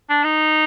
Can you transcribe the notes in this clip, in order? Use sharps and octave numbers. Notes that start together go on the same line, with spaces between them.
D4
D#4